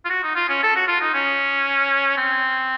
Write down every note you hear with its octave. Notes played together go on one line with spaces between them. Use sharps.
F4
F#4
D#4
F4
C#4
A4
F#4
F4
D#4
C#4
C4